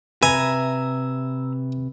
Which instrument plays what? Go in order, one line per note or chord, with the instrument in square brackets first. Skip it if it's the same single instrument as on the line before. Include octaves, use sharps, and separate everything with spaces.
[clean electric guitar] C3 B4 [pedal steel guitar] E5 A#5 [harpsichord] G#5